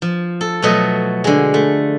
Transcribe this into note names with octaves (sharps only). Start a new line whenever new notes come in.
F3
A4
B2 F3 F#3 A3 D#5
D3 G#3
A3